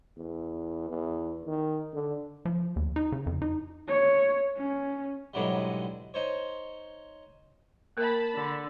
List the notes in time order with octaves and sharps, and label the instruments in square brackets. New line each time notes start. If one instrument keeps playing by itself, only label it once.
[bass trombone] E2
E2
D#3
D3
[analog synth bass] F3
D#2
D#4
C#3
F2
D#4
[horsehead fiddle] C#5
C#4
[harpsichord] G#2 B2 D3 E3 F#3 G3
D#4 C5 C#5
[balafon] A#3 A#4 [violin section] A5 B5
[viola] D3